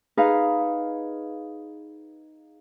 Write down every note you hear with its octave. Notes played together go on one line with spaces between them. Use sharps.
D#4 G#4 B4 F5